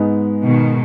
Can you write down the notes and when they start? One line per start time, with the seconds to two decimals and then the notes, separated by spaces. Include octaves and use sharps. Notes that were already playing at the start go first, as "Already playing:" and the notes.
Already playing: G#2 G#3 B3 D#4
0.42 B2 D#3